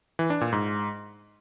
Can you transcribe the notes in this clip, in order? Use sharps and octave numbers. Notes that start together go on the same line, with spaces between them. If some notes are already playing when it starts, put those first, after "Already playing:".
E3
D4
A#2
G#2